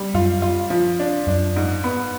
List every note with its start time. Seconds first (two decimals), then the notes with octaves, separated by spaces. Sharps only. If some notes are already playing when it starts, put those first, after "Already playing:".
Already playing: G3
0.14 F#2 F4
0.42 F4
0.70 F3
0.99 D4
1.27 F#2 D4
1.56 G#2
1.84 B3